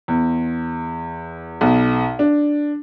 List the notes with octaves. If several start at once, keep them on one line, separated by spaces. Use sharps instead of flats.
E2
B1
D4